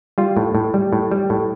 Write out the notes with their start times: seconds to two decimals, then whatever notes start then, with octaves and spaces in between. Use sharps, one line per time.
0.18 G3 F4
0.37 A2
0.55 A2
0.74 G3
0.93 A2
1.11 G3
1.30 A2